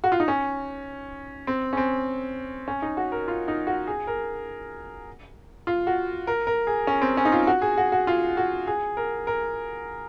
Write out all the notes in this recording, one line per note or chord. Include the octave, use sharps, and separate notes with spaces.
F#4
F4
D#4
C#4
C4
C#4
C4
C#4
D#4
F#4
A#4
F4
D#4
F#4
G#4
A#4
F4
F#4
A#4
A#4
G#4
C#4
C4
C#4
D#4
F4
F#4
G#4
F#4
F#4
F4
F#4
G#4
A#4
A#4